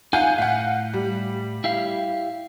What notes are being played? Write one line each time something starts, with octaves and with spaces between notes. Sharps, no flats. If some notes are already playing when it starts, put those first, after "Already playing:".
D#4 F4 F5 F#5 G#5 G6
A2 F5 F#5
G3
E4 G4 F5